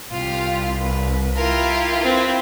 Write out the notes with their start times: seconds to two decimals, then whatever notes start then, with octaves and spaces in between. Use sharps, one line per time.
0.12 C2 F4 G4
0.80 B4
1.35 E4 F4 G4 A#4
2.03 C4 B4